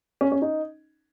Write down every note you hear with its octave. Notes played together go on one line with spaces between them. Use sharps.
C#4
C#4
D#4